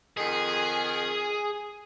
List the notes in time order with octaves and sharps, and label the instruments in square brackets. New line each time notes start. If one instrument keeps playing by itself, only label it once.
[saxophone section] F2 D#3 [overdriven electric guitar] G#4